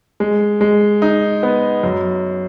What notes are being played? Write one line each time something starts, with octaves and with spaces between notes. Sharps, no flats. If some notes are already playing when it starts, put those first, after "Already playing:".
G#3
G#3
D#4
B3
F#2